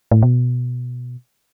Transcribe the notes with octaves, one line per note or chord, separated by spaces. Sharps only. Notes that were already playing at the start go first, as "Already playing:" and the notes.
A2
B2